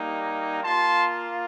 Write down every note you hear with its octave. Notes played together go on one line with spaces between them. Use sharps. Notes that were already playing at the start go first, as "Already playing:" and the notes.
Already playing: G3 A#3 D#4
A#3 F4 A5 C6